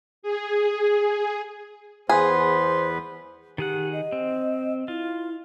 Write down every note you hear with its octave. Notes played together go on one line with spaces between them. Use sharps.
G#4
E2 B3 G#4 B4 C5
D#3 G4 G#4 F#5
D#5
C4
E4 F4